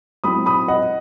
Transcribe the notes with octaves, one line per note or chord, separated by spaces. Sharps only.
F#3 C4 E4 B5 D#6
B5 D#6
D#5 F#5